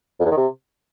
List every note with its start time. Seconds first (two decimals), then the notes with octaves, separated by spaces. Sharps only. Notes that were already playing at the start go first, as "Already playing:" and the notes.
0.20 F2
0.25 E2
0.31 D#3
0.37 C3